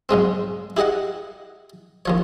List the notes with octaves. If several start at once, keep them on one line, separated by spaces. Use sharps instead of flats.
B1 G#2 G#3 C4
E4 G4 G#4 D#5 F#5
D#2 F3 C#5